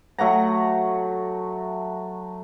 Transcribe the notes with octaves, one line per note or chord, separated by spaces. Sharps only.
F#3 A3 F#5 A#5